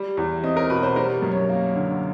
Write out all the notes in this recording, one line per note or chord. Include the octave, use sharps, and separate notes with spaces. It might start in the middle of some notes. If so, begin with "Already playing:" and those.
Already playing: G3
E2
C4 D#5
A#4
B2 B4
C5
G3 A#4
F#2
C#5
A#3
D3